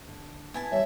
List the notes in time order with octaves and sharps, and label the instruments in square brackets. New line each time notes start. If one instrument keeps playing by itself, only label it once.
[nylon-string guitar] D3
[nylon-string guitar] B3 [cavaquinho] E4 G#5 A5
[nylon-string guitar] E3 G3 [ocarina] C#5 [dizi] E5